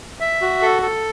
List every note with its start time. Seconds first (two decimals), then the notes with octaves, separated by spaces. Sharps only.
0.20 E5
0.42 F#4
0.62 A4
0.82 A4